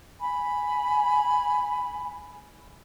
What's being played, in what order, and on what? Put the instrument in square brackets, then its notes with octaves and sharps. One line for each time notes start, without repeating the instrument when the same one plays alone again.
[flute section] G#5 B5